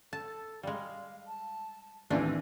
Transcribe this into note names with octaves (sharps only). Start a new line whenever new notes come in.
A4 A5
G3 G#3 F5
A5
A1 D#2 A2 E3 C4 D4 G4 G#5